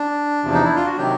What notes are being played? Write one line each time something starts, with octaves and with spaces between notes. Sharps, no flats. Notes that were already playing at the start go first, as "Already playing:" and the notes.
Already playing: D4
E2 C3 F3
D#4
E4
F4
F#4
C3 D#3 F#3 G4